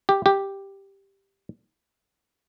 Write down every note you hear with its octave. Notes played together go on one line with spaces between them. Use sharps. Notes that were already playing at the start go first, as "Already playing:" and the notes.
G4
G4